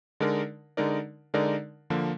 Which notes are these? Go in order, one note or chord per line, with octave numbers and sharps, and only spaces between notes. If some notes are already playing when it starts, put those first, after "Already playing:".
D3 G#3 D#4 A#4 D5
D3 G#3 D#4 A#4 D5
D3 G#3 D#4 A#4 D5
D3 F3 A#3